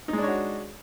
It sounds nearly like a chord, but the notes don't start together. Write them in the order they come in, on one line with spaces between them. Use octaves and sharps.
D#4 G#3 D4 C#5 F#4